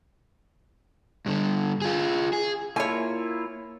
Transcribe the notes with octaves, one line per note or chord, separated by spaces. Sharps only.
G2 D3
F4 G#4
G#4
A#3 E4 F4 C#5 G#5